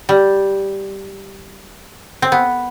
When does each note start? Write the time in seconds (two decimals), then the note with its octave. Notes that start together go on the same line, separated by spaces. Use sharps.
0.09 G3
2.22 C4
2.32 B3